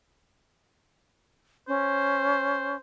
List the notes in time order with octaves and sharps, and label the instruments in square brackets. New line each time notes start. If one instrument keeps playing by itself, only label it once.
[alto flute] C#4 [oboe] C5